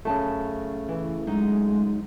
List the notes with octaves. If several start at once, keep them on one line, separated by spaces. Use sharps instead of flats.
F#2 C#3 A3 A5
E3
F#3 G#3 D#4